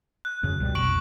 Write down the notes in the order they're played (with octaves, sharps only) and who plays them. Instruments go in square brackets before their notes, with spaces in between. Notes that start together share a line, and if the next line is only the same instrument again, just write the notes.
[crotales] F#6
[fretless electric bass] F#2 C#3
C#2 B2 G3
[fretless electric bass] F1 B1 [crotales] C#6 D7 F#7